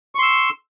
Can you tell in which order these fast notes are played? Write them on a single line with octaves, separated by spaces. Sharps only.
C#6 C6 E6